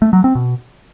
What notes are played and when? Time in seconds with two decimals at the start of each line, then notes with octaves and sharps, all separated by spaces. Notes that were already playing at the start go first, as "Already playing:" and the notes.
0.02 A3
0.13 F#3
0.24 C4
0.35 B2